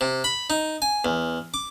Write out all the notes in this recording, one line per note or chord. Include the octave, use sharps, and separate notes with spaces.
C3
B5
D#4
G#5
E2
D6